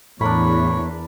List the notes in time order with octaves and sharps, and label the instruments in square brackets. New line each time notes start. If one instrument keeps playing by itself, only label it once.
[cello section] E2 [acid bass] A2 [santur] D4 A#4 B5 [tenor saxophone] C#5